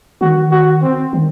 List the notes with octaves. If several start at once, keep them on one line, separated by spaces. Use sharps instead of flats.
D#3 F#4
F#4
C4
D#3